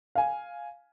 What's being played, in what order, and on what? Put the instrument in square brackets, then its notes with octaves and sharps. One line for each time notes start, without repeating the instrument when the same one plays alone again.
[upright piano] F5 G#5